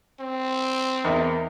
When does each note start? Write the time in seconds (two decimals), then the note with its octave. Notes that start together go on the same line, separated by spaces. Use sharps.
0.21 C4
1.04 E2 D#4 A#4